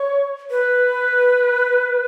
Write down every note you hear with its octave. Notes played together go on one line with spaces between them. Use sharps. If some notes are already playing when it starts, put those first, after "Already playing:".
Already playing: C#5
B4